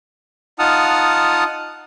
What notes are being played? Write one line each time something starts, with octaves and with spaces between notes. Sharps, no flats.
D#4 F4 F#5 A5 D#6 F6